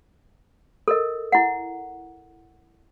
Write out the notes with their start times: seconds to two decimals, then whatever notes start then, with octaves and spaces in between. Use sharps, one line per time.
0.88 A4 A#4 D#5
1.32 E4 F#5